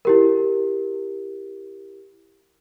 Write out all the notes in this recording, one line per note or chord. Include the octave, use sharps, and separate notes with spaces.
E4 G4 A#4